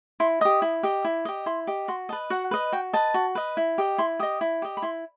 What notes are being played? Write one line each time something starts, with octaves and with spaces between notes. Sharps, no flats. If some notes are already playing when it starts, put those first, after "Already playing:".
E4 C6
G4 D#5 D#6
E4
G4 D#5
E4
G4 D#5
E4 C6
G4 D#5
F#4 C6
B4 D#5 A5
F#4 F#5
B4 D#5
F#4 G5
B4 D#5 A5
F#4
B4 D#5
E4
G4 D#5
E4 C6
G4 D#5 D#6
E4
G4 D#5
B5
E4 C6